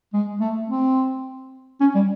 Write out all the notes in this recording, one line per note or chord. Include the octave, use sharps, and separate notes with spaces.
G#3
A3
C4
C#4
G3